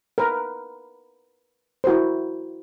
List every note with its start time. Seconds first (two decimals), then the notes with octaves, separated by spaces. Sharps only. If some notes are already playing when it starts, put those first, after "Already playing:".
0.18 A#4 B4
1.84 E4 F#4 A#4 C5